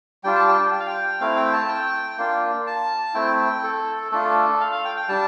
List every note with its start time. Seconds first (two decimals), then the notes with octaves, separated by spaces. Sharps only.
0.24 G3 D4 F4 G5
0.36 A5
0.48 G5
0.72 G5
0.80 F5
0.87 G5
1.20 A3 C4 E4 F5
1.36 G5
1.53 A5
1.69 G5
2.18 A#3 D4 F4
2.67 A5
3.14 A3 C4 E4 G5
3.64 A4
4.12 A3 D4 F4 A4
4.61 F5
4.72 F5
4.85 G5
4.96 G5
5.09 G3 D4 A5